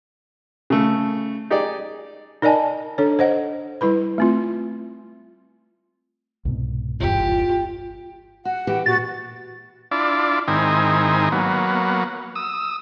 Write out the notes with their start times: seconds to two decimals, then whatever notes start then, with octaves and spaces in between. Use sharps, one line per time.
0.70 C#3 A3
1.50 D#4 G4 G#4 D5
2.42 D#4 A#4 D5 D#5 G#5 A5
2.98 D4 A4 C#5
3.19 C5 D#5 F#5
3.81 G3 E4 B4 B5
4.18 A3 C4 F4
6.45 C2 G#2 B2
7.00 G1 E2 F4 G4
8.45 F#4 F#5
8.67 E3 F#4 G4
8.86 A#2 F#4 A6
9.91 D4 E4 F4 D5
10.48 G#2 D#3 C4 D#4 E4 G#5
11.32 F#3 A#3 B3
12.35 D#6 E6